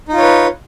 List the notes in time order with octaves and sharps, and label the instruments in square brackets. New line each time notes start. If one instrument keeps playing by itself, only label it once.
[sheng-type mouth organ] D#4
F4
C#5
B4